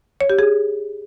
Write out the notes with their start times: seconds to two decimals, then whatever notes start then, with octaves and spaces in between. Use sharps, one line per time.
0.21 C#5
0.30 G4
0.39 G#4